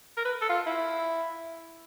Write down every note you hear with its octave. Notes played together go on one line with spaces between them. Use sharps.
A#4
B4
A4
F4
E4